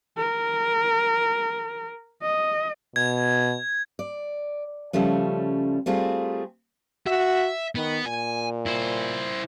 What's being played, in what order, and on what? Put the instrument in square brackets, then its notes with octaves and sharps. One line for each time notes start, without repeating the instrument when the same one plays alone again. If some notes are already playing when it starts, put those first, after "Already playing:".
[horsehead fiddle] A#4
D#5
[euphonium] B2 [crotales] G#6
[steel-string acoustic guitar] D5
C#3 F3 G3 A3 C#4
G3 A3 C4 F4 G#4
[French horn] F#4 [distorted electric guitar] E5
[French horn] D#3 [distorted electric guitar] B3
[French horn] A#2 [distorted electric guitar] G#5
[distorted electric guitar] E4 C5